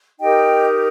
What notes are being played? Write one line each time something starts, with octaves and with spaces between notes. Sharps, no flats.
D#4 G4 A#4 D#5 G5